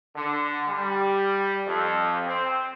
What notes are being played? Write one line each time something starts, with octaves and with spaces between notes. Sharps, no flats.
D3
G3
F2
C4